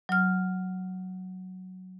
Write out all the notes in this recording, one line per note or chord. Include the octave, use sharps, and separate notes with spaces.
F#3 F6